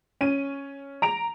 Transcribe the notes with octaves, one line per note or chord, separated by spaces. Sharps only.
C#4 D#7
A#5 D7 F7